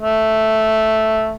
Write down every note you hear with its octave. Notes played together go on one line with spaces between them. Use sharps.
A3